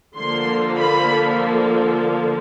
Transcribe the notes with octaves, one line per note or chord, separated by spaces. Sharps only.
D3 F3 A#3 C6
B5